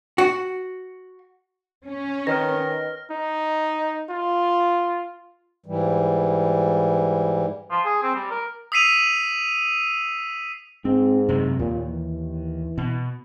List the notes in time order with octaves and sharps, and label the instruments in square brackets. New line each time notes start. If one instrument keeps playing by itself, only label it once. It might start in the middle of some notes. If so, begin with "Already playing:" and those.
[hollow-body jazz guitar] F#4
[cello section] C#4
[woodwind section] D#3 [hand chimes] B4 [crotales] F6 A#6
[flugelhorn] D#4
F4
[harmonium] G#2 E3 G3
[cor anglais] F3
G#4
C4
G3
A#4
[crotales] D#6 E6 B6 C7 D#7 F7
[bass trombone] G#2 [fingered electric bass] C4
[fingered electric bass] F#2 C3
[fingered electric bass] D#2 [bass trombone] A#2
[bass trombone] E3
[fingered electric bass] B2